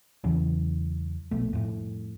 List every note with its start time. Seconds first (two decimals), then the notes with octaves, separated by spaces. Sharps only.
0.24 E2 C#3 E3 F#3
1.31 A#1 B2 A3
1.53 F2 A2